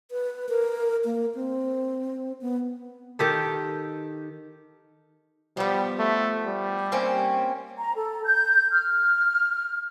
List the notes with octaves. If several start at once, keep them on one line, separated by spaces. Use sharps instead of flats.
B4
A#4
A#3
C4
B3
D#3 G4 A4
F3 G3 B3
A3
G3
A#3 C4 C#4
A#5
A4
G6
F6